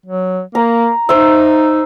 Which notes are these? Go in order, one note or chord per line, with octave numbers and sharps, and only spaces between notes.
F#3
A#3 A#5
D#4 C5 E5